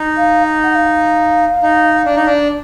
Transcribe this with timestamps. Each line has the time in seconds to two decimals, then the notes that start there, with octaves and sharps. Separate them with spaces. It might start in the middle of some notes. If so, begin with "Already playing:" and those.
Already playing: D#4
0.17 F5
0.64 F#5
0.75 F5
1.63 D#4
2.06 D4
2.16 D#4
2.26 D4